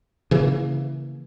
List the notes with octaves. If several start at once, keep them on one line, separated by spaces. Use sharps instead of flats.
C#3 E3 A#3